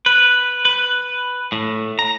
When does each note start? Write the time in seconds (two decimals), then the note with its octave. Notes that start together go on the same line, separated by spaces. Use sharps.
0.06 B4
0.65 B4
1.52 A2
1.99 A#5